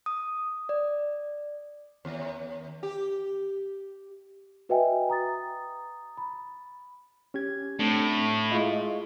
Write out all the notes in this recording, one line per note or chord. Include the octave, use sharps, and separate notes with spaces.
D#6
D5
D#2
G4
F#4 B4 D#5 E5 G5 G#5
A#5 D#6 A6
B5
C#4 G4 G#6
A2 C4 D4
G#3 E4 F4 D#5 C#6